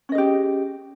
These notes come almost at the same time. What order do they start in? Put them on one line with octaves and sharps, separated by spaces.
C#4 D#5 G#4 G4